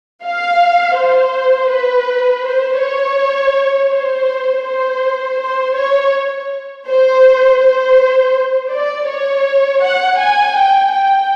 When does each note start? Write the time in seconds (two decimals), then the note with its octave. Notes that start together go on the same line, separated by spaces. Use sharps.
0.24 F5
0.97 C5
1.71 B4
2.45 C5
2.81 C#5
3.92 C5
4.66 C5
5.40 C5
5.76 C#5
6.87 C5
7.61 C5
8.72 D5
9.09 C#5
9.82 F#5
10.19 G#5
10.56 G5
10.92 G5